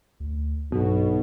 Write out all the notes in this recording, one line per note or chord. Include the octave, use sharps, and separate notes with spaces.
D2
B1 G2 B2